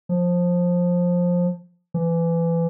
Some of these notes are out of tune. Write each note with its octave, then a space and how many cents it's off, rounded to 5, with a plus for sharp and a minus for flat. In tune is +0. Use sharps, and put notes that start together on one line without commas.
F3 +15
E3 +25